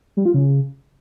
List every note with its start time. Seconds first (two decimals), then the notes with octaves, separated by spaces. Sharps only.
0.17 G3
0.25 F4
0.34 C#3